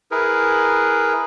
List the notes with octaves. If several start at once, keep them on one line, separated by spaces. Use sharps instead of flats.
E4 G#4 A#4 B4